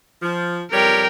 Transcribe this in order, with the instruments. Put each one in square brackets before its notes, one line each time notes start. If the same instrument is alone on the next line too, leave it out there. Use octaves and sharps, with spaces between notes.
[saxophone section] F3
[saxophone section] F2 G3 C#5 [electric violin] A#4 G5